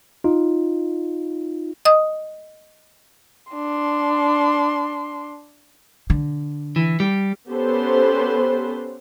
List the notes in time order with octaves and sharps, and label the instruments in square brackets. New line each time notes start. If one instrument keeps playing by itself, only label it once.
[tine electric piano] D#4 F4
[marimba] D#5 D#6
[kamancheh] D4 C6
[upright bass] D3
[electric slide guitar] E3
G3
[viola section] B3 C#4 G4 A4 B4 C5